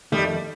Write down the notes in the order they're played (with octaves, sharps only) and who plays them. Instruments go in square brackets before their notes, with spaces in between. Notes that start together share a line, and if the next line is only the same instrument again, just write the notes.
[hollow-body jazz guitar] F2 D#3 A3 D#4 [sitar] G3